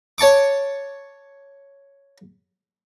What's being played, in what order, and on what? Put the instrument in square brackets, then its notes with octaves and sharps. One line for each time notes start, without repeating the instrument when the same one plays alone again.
[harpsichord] C#5 A5 C#6 D6